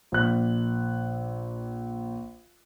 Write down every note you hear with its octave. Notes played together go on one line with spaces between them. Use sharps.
A#1 F#6